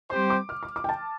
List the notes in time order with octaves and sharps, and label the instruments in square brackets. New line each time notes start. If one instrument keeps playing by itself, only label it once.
[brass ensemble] G3 C4 G4 C5 [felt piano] C6
[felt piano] D6
F6
D6
D6
G5
A5